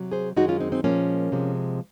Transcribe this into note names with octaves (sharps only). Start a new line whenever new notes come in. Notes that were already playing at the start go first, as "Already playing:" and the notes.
Already playing: C3 F#3
G#4 C5
F#2 D#3 G#3 D#4 F#4
C#4 F4
C4 D#4
C4 D#4
A#2 F3 G#3 A#3 C#4
C3 F3 G#3